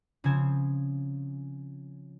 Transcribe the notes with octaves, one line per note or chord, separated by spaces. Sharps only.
C#3 F3 C4 C5 G#5 G#6